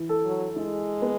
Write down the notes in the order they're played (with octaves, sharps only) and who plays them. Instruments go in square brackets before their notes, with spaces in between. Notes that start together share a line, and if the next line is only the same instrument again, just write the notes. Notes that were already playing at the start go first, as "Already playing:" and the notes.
Already playing: [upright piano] E3
A4
[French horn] F#3
[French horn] G#3 [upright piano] E4
[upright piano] B3